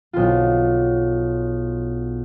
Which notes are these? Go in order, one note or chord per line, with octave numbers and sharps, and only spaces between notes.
B1 F4